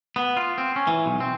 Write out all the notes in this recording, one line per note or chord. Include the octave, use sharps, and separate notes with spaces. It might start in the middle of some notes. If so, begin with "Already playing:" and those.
B3
F4
C4
C#4
E3
B1
C4